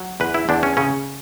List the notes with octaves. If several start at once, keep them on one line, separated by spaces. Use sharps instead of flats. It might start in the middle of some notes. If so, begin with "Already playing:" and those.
Already playing: F#3
E2 B4
E4
E2 D4
C#4
C#3 C#4